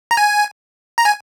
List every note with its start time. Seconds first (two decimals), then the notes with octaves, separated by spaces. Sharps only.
0.11 A#5
0.17 G#5
0.98 A#5
1.05 G#5